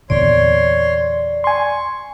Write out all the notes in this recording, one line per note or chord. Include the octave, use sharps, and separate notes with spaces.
E2 A#2 D3 C#5 D5 C6
G#5 C6 C#6